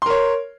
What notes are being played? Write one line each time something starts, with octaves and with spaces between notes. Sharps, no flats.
A#4 C#5 C6